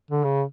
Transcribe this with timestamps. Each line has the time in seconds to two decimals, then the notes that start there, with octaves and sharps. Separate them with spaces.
0.11 D3
0.24 C#3